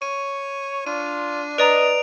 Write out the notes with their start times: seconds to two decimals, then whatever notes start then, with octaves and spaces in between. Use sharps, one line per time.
0.02 C#5 D#7
0.87 D4 F4 D#7
1.58 B4 D5 D#5 A#5 D#6 D7 F7